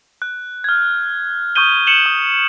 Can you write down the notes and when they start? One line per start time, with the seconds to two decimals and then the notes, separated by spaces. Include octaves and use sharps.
0.22 F#6
0.64 F6 G#6
1.55 C#6 D#6 G6 D#7 G7
1.87 C#7 E7 F#7 G7
2.06 D#6